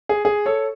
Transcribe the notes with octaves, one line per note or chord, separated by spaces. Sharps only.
G#4
G#4
A4 C#5